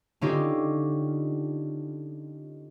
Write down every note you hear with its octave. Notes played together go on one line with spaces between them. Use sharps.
D3 C#4 D#4 F4 G4